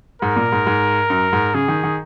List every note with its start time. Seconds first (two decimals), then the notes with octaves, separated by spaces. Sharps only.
0.22 G#2 A#4
0.36 A#2
0.52 G#2
0.67 G#2
1.10 F#2
1.33 G#2
1.54 C#3 G#4
1.68 D#3
1.84 D#3